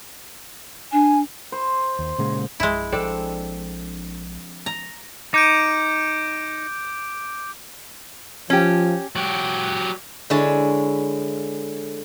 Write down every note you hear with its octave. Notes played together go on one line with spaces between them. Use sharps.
D4 G#5
C5
D#2
A#2 C#3 G#3
A#1 F#2 G#3 E4
F3 C4 D4 A4
A#5
D#4 D6 G6 D7
F3 C#4 G4
F#3 G4
D3 G#3 E4 C#5 G#5 A5